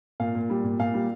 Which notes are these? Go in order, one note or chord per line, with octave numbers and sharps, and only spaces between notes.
A#2 F5
A#2
G3
A#2
A#2 F5
G3